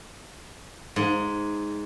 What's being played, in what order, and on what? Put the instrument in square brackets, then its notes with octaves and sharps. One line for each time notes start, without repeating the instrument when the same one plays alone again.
[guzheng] G#2